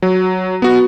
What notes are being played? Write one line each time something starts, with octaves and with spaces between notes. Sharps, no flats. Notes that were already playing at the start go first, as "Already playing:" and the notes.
F#3
B3 F#4